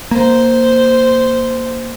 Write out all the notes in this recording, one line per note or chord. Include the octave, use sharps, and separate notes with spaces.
A#3 C5